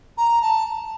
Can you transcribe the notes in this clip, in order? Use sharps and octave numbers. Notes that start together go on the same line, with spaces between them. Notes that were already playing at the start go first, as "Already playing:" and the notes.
A#5
A5